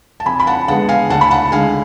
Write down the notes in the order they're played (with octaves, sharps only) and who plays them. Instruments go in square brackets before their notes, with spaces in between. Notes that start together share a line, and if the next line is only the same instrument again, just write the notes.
[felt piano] A5
F2 G#5 B5
B5
F#5 A5
D3 G#3 B3 F#5 A5
F5 G#5
D2 F#5 A5
B5
F#5 A5
D3 G#3 F5 G#5